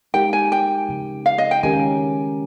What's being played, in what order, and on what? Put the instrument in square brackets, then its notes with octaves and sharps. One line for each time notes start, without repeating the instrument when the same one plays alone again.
[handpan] G#3 D#4 G4 A#4 [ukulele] G5
[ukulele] G#5
G5
[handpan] C#3 F3 C4
[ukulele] F5
D#5
G5
[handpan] D#3 G#3 C#4 G4 A#4 [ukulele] G#5